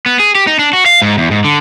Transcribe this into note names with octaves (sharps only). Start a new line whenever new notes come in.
B3
G#4
G4
D#4
D4
F#4
F5
G#2
E2
G#2
D3